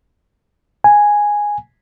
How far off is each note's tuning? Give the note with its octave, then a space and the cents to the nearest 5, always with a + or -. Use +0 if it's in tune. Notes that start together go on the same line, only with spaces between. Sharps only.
G#5 -5